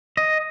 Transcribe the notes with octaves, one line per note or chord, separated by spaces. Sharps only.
D#5